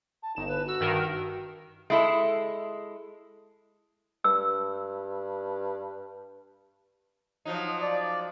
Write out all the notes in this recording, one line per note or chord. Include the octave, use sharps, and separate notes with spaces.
A5
G1 D#4 E7
B4
F#4 E6 E7
G2 D#3 A#4
G#3 E4 A4
G2 E6
F3 F#3 D#4
D5